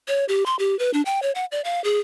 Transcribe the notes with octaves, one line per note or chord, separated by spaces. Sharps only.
C#5
G4
C6
G4
B4
D4
G5
C#5
F#5
D5
F5
G#4